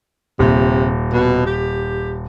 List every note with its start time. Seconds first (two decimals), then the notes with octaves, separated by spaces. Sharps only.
0.39 D#1 C3
1.12 B2
1.47 G4